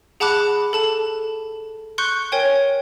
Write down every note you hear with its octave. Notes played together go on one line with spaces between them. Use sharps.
G#4 F#5 A5 B5 D6 F#6
A4 A5 E7
C6 C#6 F#6 G6 C#7
A#4 C#5 G5 G#5